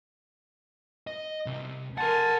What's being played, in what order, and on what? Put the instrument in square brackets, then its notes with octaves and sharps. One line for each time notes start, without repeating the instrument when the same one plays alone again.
[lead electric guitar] D#5
C2 C3
[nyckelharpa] A#4 G#5 [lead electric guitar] F#5 C6 [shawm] A5